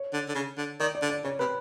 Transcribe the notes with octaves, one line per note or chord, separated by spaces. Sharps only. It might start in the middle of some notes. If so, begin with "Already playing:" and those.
Already playing: C#5
D3
D3
C#3
D3
D#3 D5
D5
D3
D5
C#3 C#5
C3 B4